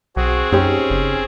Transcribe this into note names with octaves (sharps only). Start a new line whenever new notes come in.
B1 C4 F#4 G#4
F#2 C#4 D#4 G4 C5
F#1